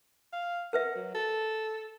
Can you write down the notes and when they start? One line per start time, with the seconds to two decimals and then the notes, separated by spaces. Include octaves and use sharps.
0.33 F5
0.73 A#4 B4 E5 F#5
0.95 F#3
1.15 A4